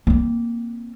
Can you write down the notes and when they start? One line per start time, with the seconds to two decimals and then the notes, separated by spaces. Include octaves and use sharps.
0.07 A#3 C4